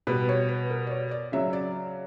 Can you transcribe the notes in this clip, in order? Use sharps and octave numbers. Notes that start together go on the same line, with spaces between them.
B2 G3 B4
C#5
B4
A#4
D5
C#5
D5
C#3 F#3 E5
D5